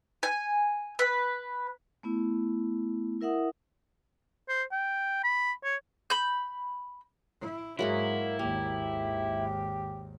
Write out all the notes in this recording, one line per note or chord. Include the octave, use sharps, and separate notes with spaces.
G#5
B4
A3 B3 E4
E4 A#4 E5 F#5 D#6
C5
G5
B5
C#5
B5 G6
E4
G#2 F#3 G#3 A#3 E4 F#4
G#1 D#2 A#3 G4